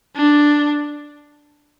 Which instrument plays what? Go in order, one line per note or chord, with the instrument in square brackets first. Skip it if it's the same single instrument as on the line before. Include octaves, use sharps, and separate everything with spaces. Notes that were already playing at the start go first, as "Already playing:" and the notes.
[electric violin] D4